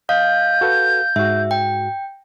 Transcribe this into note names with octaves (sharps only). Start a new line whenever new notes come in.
D#5 F5 G6
F#4 A4 B4
G#2 F#4 E5
G5